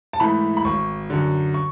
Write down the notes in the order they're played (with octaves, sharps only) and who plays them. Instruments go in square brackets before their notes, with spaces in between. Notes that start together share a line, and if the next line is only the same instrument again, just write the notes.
[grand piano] A5
G#2 E3 A3 B5
B5
G#1 C#6
F#2 D3
C#6